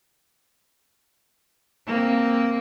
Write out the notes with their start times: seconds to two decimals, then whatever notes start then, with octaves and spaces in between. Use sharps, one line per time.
1.87 A#3 C4